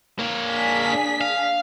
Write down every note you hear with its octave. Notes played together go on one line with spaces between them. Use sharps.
A#3 C#5
D4 G#4 B6
F5